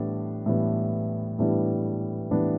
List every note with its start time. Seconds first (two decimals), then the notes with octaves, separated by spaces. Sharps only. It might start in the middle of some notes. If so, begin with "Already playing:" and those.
Already playing: A2 E3 G3 B3 D4
0.46 A2 E3 G3 B3 D4
1.39 A2 E3 G3 B3 D4
2.31 A2 E3 G3 B3 D4